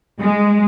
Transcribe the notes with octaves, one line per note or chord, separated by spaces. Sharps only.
G#3